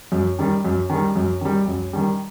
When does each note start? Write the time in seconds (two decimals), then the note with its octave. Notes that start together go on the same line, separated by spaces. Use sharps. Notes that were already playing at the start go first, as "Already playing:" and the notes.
0.12 F#2
0.39 D#3 G3
0.65 F#2
0.90 D#3 G3
1.16 F#2
1.41 D#3 G3
1.67 F#2
1.93 D#3 G3